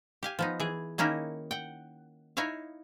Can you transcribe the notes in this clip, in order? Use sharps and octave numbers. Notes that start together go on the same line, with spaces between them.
G4 F5 G#5
F3 B3 D#4
E3 G#4
D#3 A#3 C#4 D#4 E4
F#5 G5
D#4 E4 C#5 E5 F5